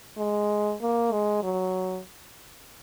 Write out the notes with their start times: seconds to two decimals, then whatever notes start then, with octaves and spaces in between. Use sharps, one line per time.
0.18 G#3
0.81 A#3
1.12 G#3
1.43 F#3